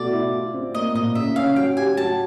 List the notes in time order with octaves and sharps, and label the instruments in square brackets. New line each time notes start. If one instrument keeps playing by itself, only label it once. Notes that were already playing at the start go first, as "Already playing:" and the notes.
Already playing: [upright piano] B2 A3 [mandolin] D5
[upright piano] E4
F4
C4
[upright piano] A#3 [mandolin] D#5
[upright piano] A#2 [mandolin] D#5
[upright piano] C#3 [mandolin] E5
[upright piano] C#4 [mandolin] F5
[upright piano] F#3 [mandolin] G5
[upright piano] G4 [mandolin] G#5
[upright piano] F#3 [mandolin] A5